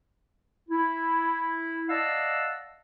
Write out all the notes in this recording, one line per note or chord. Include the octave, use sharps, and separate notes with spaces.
E4
D5 D#5 F5 F#5 A5 E6